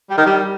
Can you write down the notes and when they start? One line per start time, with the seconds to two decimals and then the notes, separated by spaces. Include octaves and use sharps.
0.10 G3
0.18 D#3
0.26 G3